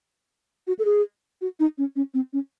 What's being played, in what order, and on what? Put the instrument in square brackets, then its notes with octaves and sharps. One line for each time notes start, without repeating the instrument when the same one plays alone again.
[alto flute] F#4
A4
G#4
F#4
D#4
C#4
C#4
C4
C#4